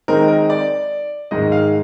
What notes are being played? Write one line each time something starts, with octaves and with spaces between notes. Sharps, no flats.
D#3 G#3 C4 D#4 A#4
A#4
D5
G#2 D#3 G#3 D#4 D#5
F5